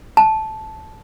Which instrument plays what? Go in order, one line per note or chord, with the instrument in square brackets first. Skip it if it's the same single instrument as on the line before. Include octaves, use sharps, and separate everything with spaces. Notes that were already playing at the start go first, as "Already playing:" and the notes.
[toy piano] A5